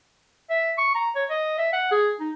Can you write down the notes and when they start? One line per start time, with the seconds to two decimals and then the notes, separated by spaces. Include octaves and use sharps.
0.50 E5
0.78 C#6
0.95 A#5
1.16 C#5
1.30 D#5
1.59 E5
1.73 F#5
1.91 G#4
2.20 D#4